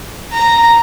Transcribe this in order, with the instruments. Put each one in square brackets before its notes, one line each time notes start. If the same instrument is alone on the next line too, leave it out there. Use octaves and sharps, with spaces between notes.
[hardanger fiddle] A#5